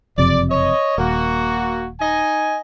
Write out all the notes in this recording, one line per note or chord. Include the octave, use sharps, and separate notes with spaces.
F#1 F2 C3 D5
C#5 D#5
D#1 A#3 F#4
D#4 D#5 G#5